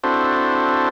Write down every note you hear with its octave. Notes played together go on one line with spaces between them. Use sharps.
C4 D4 E4 F#4 A4 C5